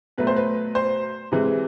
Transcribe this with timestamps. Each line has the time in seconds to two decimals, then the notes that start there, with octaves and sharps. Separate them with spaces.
0.18 B2 F#3 A3 B4
0.27 C5
0.36 B4
0.75 C5
1.32 C3 E3 G#3